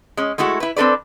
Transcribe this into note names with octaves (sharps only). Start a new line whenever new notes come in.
G#3 C#4
G#3 A3 E4 F#4
E4 B4
C4 D4 A4 B4 D5